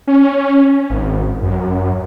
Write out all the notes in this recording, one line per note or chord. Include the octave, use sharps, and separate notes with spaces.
C#4
G#1
F#2